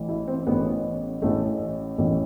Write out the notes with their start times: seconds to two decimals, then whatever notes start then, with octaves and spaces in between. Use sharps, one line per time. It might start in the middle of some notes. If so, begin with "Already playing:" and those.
Already playing: A1 A2 E3
0.09 E4
0.28 C4
0.47 A1 A2 E3 B3
1.22 A1 A2 E3 A3
1.98 A1 A2 E3